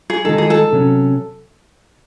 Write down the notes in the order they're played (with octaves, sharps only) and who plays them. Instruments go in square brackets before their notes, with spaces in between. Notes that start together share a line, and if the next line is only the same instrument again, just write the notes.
[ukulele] G#4
[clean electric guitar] D#3 G#3 D#4 [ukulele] A4
[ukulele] G#4
A4
[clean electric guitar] C3 F#3 C#4